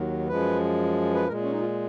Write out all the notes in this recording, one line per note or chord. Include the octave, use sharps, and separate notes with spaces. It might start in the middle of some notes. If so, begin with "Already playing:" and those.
Already playing: D#2 D#3 F#3
F#2 F3 G#3 B4
B4
A#2 G#3 A#4
C#4
D#4
F4